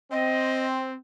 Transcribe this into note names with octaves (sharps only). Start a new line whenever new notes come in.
C4 D#5